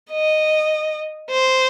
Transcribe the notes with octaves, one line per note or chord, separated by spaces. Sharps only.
D#5
C5